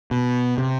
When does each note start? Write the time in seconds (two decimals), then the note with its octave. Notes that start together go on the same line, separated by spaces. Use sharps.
0.11 B2
0.58 C3